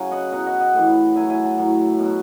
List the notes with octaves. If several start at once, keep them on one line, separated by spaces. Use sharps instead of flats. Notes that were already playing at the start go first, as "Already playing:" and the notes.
Already playing: C#3 F#3 G#5
D#5 F#5
B2 F#3 D#5 F#5
D#5 F#5
D#5 F#5
A2 E3
A2 F#3 E5 G#5
E5 G#5
F#5 A5
A2 F#3
B2 F#3